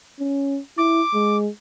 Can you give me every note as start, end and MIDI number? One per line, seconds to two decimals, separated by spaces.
0.20 0.59 61
0.78 1.02 64
0.78 1.37 86
1.14 1.49 56